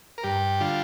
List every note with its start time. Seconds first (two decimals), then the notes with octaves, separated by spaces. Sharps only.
0.18 A#4
0.23 G2 G4
0.60 D3 G3 F4